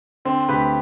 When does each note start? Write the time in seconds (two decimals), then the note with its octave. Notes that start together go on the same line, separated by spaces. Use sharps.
0.25 D3 C4
0.49 D2 G4 B4